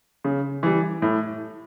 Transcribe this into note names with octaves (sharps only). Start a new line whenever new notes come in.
C#3
E3 G3
A2